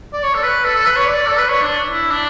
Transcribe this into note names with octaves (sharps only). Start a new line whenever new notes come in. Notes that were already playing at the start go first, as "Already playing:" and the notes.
D5
C#5
A4
B4
A4
A4
B4
C#5
D5
A4
B4
C#5
D4
E4
D4